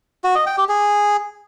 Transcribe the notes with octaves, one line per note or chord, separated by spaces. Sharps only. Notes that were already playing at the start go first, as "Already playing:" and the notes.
F#4
D#5
G5
G4
G#4